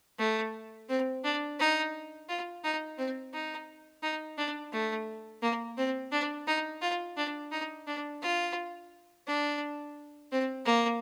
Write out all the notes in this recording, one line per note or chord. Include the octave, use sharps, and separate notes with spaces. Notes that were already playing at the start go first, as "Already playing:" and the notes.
A3
C4
D4
D#4
F4
D#4
C4
D#4
D#4
D4
A3
A#3
C4
D4
D#4
F4
D4
D#4
D4
F4
D4
C4
A#3